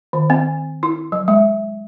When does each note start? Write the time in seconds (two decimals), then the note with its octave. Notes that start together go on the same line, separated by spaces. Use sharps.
0.13 D#3
0.30 C4
0.83 E4
1.12 F#3
1.28 G#3